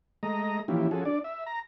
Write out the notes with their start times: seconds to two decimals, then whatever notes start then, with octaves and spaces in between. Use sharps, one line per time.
0.23 G#3 A3 D#5 A#5
0.68 E3 F3 A#3 C#4 E4 G4
0.91 F3 C#4 F#4 G#4 A4
1.05 D4 D5
1.24 E5
1.46 A#5